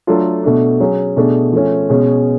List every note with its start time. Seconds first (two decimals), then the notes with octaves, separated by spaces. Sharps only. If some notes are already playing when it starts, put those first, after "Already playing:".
0.07 F#3 A3 D4 F4 A4
0.43 B2 A3 D4
0.80 F#3 C#4 G#4
1.17 B2 A3 D4 G#4
1.52 F3 A3 C#4
1.89 B2 G#3 C#4 G#4